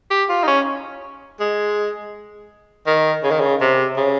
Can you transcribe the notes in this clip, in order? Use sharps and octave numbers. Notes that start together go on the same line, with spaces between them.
G4
F4
D#4
C#4
G#3
D#3
C#3
D#3
C#3
C3
C#3